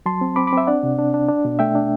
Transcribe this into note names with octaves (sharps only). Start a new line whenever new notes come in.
F#3 A5 C6
C4
C4 B5 D6
B5 D6
C4 C5 E5
D4 D5 F#5
C3
D4
D4
D4
B2
A3 E5 G5
D4